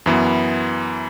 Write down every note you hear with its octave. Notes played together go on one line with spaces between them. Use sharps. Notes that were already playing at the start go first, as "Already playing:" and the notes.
F#2 E3 B3